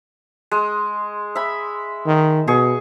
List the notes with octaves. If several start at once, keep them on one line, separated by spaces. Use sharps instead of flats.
G#3
E5 B5
D#3
B2 G#4 C#6